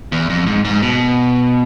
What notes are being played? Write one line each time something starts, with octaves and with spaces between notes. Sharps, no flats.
E2
F2
G#2
G#2
B2